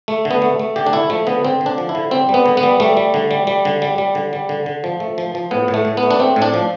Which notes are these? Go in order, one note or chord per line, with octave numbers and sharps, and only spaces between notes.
A3
D3
B3
A3
A3
D3 G4
D4
A3 E4
F3 A3
D3 B3
D3 C4
D3
D4
F3
E4
D3
G3 C4
G3
B3
D3
B3
G3
G3 A3
G3
D3
G3
G3
D3
G3
G3
D3
G3
D3
D3
F3
A3
F3
F3
A2 B3
A2
A3
A2
B3
A3
D4
A3 C4
A2
D4
F3